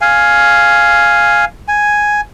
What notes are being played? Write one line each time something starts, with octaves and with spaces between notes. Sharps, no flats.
F5 G#5
G#5